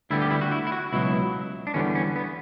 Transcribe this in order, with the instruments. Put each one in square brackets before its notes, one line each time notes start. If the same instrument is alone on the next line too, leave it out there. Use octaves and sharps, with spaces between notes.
[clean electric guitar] D2 D3 G3 B3 E4
G4
E4
F#4
E4
E4
F#4
C#2 B2 F#3 E4
D4
E2 D3 G3 B3 C#4
C#4
B3